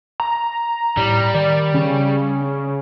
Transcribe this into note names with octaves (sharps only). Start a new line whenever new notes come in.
A#5
A2 G3
D#3 D5
C#3 C#4